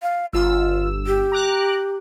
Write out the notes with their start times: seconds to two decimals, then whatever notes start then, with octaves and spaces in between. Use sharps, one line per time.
0.02 F5
0.33 G1 F4 E6
1.07 G4
1.32 A#5 D6 F#6